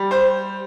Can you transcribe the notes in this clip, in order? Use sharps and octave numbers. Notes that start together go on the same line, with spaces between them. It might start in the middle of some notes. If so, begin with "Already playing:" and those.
Already playing: G3
C5